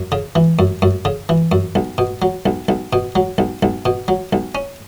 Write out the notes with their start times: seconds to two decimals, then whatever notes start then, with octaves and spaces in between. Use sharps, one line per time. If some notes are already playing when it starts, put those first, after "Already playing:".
Already playing: F#2
0.12 C#3
0.35 E3
0.59 F#2
0.82 F#2
1.05 C#3
1.29 E3
1.52 F#2
1.75 B1
1.98 B2
2.22 F#3
2.46 B1
2.69 B1
2.93 B2
3.15 F#3
3.38 B1
3.63 B1
3.86 B2
4.08 F#3
4.33 B1
4.55 C#4